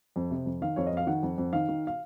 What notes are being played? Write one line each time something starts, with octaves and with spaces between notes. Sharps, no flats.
F2
C3
F2
D#3 F5
F2 C#5
D#5
F2
F5
D#3 F#5
F2
F2
D#3 F5
D#3
F5